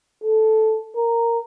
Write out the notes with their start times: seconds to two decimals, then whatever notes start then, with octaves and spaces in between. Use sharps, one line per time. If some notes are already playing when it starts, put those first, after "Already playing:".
0.24 A4
0.96 A#4